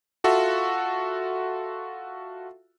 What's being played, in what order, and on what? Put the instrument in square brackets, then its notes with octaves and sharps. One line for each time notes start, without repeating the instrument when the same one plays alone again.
[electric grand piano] F4 F#4 A4 E5